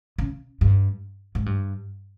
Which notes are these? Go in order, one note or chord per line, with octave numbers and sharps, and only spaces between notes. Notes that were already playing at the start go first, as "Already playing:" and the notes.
C#3
G2
G#2
G2